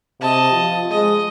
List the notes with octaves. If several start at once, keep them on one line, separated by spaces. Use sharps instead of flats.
C3 D#5 A5
F3
G#3 D#5